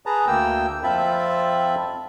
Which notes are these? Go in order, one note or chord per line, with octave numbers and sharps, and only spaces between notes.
G#4 B4 A5 A#5
D2 A#3 G5 E6
F2 C4 F4 E5 A5 B5